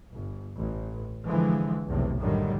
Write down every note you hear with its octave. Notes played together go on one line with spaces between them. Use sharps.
G1
A1
D3 E3 F3 G#3
B1 E2 A2 C3
F#2 A2 D3 D#3 G3